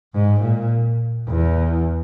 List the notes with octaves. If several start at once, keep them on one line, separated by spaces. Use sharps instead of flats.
G#2
A#2
E2